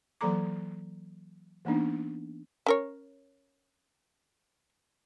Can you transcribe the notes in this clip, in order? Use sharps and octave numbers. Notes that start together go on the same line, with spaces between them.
E3 F#3 A#3 A4 A#5 D6
E3 A#3 B3 D4 D#4
C#4 A#4 C#5